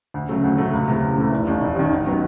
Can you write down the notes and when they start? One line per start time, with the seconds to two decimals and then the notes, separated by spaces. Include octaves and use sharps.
0.14 D2
0.29 C#3 F#3 A3
0.44 D2
0.58 C#3 F#3 A3
0.73 C#2
0.88 C3 E3 A3
1.02 C#2
1.18 C3 E3 A3
1.32 F1
1.47 D#2 D#3
1.61 F1
1.76 D#2 D#3
1.91 G#1
2.07 D#3 F#3 B3